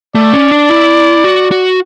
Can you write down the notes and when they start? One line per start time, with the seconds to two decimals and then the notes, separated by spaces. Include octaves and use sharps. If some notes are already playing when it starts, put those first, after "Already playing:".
0.15 A3 D5
0.33 C#4
0.51 D4
0.70 E4
1.24 F#4
1.51 F#4